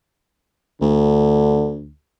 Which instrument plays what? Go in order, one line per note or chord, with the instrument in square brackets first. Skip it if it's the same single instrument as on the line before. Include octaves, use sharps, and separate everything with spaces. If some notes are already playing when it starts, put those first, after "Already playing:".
[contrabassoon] D2 [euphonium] D3